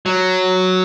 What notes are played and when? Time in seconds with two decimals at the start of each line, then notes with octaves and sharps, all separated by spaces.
0.06 F#3